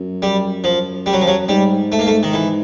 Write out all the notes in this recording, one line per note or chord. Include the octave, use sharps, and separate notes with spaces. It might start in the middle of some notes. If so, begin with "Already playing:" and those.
Already playing: F#2
G3
F3
G3
F#3
F3
F#3
G#2 G3
A3
A#3
A3
D#3
E3